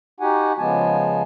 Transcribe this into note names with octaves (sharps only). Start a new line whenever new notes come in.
D#4 F#4 G4 F#5 G#5
C#3 F3 G#3 B3 G#5 A5